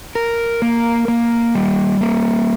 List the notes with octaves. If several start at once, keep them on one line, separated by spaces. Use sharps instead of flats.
A#4
A#3
A#3
G3
A#3